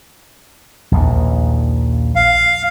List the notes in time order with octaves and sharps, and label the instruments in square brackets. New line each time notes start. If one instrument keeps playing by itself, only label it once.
[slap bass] A#1 D#2
[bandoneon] F5